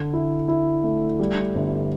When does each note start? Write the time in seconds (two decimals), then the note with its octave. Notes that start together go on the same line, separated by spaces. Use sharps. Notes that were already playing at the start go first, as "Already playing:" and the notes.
Already playing: D3
0.13 E4
0.48 E4
0.83 A3
1.19 G3
1.55 G1